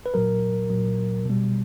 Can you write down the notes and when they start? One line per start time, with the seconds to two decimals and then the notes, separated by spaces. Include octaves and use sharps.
0.06 B4
0.14 A#2 F#3 A#4
0.70 A#2 F#3
1.25 B2 G3